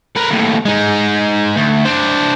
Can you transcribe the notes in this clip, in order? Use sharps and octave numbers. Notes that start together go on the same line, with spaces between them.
A#4 B4
D#2 A2
G#3 D#4
D2
D4 C5